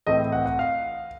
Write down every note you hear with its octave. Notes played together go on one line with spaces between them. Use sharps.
A2 E3 A3 C4 D#5
F#5
F#5
F5